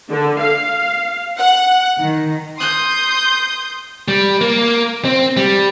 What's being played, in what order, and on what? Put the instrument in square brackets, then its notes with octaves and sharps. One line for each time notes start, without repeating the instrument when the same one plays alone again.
[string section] D3
F5
F#5
D#3
[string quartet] C6 D#6 G6
[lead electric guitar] G3
A#3
C4
G3